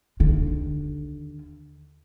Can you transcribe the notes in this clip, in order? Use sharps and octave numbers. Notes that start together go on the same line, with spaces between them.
D#2 D3